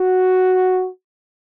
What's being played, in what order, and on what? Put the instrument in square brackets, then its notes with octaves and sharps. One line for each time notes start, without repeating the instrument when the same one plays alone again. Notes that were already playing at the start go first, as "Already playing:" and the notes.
Already playing: [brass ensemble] F#4